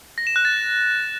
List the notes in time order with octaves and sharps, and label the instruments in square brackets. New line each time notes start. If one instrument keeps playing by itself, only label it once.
[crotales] A#6
E7
F#6
A6